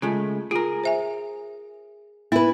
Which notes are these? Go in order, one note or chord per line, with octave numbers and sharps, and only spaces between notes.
C#3 G#3 A3 F4
F4 G#4 A#4
C5 E5 G#5
B3 E4 B4